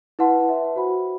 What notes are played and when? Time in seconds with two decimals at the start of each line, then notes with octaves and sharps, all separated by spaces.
0.19 E4 B4 F#5 A5 C6
0.47 B4 E5 A5
0.76 F#4 C5 F#5 B5